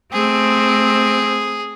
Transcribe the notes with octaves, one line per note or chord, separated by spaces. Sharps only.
A3 C4 G#4